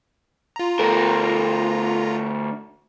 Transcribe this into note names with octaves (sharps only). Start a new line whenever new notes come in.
F4 A#5
D2 A4 A#4 A#6